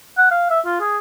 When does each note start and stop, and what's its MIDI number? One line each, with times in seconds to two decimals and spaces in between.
0.18 0.28 78
0.31 0.46 77
0.50 0.60 76
0.66 0.80 65
0.80 0.98 68